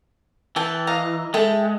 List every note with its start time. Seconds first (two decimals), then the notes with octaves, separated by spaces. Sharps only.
0.56 E3 G5 A5
0.87 D#5 F5 A#5
1.34 G#3 A4 E5 G5